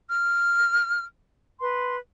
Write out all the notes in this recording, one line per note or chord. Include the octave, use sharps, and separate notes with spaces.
F6
B4 C6